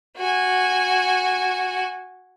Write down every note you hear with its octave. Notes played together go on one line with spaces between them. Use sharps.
F#4 G#5